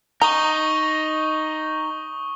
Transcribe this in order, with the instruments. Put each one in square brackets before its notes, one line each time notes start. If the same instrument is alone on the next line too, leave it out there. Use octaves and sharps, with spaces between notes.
[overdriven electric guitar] D#4 [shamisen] A#5 [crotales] C#6 D#6 G7